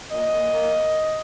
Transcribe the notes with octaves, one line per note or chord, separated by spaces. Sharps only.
A#2 D#5
A#2
A#3